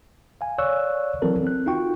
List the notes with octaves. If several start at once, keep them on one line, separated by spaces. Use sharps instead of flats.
F5 G#5
C#5 D5 F5 C#6 E6 F#6
E3 F#3 C4 A4 A#4
C4 F#6
D#4 F4 F#4 G5 C#6